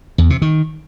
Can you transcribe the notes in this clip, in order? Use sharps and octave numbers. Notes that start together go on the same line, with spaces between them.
E2
C3
D#3